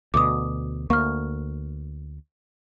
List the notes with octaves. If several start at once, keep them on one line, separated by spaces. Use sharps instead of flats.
D2 B2 D6 D#6
D2 A#3 C#6 F6